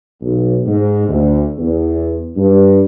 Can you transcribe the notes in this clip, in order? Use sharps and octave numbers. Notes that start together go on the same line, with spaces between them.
B1
G#2
D2
E2
G2